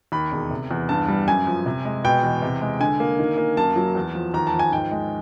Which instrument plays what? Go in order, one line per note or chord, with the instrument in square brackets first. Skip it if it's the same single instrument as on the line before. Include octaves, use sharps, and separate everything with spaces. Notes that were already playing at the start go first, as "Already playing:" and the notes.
[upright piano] D#2 B5
E1
C3
E2
G2 A5
G3
F#2 G#5
F3
C3
G#3
B2 G5
E2
C3
G#3
D3 G#5
A#3
D#3
A#3
F#2 A5
F#3
E2
F3
D#2 A#5
A5
F3
G#5
G#2 G5
G#3